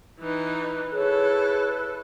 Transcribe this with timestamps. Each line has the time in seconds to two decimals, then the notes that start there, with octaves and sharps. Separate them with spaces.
0.20 E3 D#4 B4
0.94 E4 G#4 A4 C#5